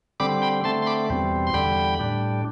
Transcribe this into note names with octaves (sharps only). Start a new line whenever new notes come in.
D3 G3 C4 B5 D6
G5 B5
D3 A3 C4 A5 C6
C6
B5 D6
E2 B2 G3 C4
C6
E2 D3 G3 G5 B5
A2 G3 D4